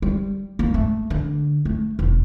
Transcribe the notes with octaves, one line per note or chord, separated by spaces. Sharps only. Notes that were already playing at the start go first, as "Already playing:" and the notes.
G3
A#3
A3
D3
A3
E1